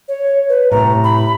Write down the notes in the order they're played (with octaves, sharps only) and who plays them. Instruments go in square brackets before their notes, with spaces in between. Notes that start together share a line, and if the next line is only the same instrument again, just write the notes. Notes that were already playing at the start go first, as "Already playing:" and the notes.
[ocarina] C#5
B4
[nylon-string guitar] A2 C3 [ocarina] A#5
[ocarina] B5